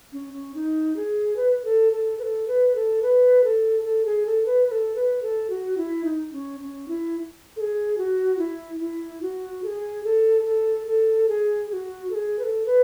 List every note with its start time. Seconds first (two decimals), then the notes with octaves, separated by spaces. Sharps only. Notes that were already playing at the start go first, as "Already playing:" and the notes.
0.13 C#4
0.34 C#4
0.54 D#4
0.96 G#4
1.36 B4
1.65 A4
1.92 A4
2.19 B4
2.23 A4
2.48 B4
2.75 A4
3.02 B4
3.44 A4
3.85 A4
4.06 G#4
4.26 A4
4.46 B4
4.67 B4
4.71 A4
4.95 B4
5.22 A4
5.50 F#4
5.77 E4
6.05 D#4
6.32 C#4
6.60 C#4
6.88 E4
7.56 A4
7.61 G#4
7.98 F#4
8.39 E4
8.81 E4
9.22 F#4
9.63 A4
9.67 G#4
10.04 A4
10.45 A4
10.87 A4
11.29 G#4
11.69 G#4
11.73 F#4
12.10 A4
12.15 G#4
12.39 B4
12.44 A4
12.66 B4